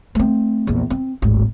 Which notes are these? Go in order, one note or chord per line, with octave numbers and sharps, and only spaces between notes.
A3 C4
A#1 E2
C4
D1 G#1